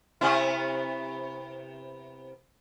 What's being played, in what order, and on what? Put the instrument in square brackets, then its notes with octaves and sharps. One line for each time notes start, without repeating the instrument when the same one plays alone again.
[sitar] C3 B3 E4